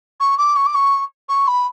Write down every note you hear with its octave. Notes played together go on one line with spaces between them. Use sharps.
C#6
D6
C#6
D6
C#6
C#6
B5